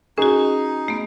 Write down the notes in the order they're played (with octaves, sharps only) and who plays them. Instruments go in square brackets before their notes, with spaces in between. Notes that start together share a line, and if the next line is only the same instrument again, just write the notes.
[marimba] C#4 F#4 [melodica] D#4 [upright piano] G#4
[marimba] A3 B3